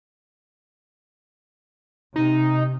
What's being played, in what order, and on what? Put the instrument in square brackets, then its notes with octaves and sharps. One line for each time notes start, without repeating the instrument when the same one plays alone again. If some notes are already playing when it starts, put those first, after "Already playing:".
[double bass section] C3 [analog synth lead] D#4